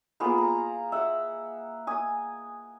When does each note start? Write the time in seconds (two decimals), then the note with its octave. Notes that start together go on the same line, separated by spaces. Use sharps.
0.20 A#3 B3 F4 G#4
0.38 A#5
0.92 E5 F#5
1.87 G#5 D#6